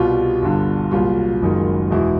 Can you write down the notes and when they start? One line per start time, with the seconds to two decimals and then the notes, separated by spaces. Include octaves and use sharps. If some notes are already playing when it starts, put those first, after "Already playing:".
Already playing: C2 B2 G3 F4
0.42 G1 G2 D3
0.91 C2 A#2 F#3 F4
1.42 F#1 F#2 D#3 G#3
1.91 E2 B2 G#3 E4